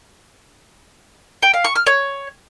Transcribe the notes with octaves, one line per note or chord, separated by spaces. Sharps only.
G5
F5
C#6
F6
C#5